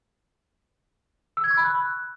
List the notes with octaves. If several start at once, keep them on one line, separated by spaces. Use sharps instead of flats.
E6
G#6
C#6
B5
F#6